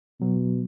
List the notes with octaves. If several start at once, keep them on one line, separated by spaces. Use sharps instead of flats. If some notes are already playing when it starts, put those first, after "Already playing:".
B2 F#3